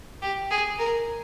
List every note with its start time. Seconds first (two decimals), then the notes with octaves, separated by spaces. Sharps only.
0.22 G4
0.51 G#4
0.79 A#4